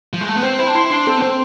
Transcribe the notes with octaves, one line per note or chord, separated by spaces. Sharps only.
F3
G#3
A3
B3
C4 C5
E4 C5
D4
E4 C6
D4 C6
C4 A4
B3
C4 C5